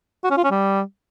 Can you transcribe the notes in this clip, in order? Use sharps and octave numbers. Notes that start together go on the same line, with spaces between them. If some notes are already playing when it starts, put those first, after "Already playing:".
F#4
C#4
F4
C#4
G3